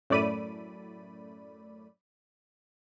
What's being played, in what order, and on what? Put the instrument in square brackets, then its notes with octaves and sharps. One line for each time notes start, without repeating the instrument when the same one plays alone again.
[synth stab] F#2 A2 A3 D5 B5 D#7